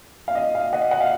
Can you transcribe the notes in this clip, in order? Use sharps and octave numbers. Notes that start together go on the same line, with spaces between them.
F5
D#5
F5
D#5 F#5
D#5 F#5
F5